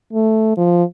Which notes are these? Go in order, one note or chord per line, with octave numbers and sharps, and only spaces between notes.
A3
F3